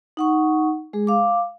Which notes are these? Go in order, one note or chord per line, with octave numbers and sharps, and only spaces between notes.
D#4 F#5 C#6
G#3 G#4
F5 D6